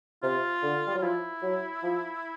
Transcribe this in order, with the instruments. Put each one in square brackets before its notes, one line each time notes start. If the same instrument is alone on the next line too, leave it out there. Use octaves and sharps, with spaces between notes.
[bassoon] C3 [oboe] F4
[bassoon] D3
G3
[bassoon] F#3 [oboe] F4
[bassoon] F3 [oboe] E4
[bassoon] F#3
F3